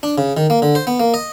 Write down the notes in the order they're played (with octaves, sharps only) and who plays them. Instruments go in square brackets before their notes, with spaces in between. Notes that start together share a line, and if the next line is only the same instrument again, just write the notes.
[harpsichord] D4
C#3
D#3
A#3
D3
C5
B3
A#3
D#5